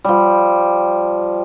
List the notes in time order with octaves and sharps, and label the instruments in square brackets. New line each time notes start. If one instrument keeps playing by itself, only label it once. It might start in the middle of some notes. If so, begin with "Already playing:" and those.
[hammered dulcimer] F3 G3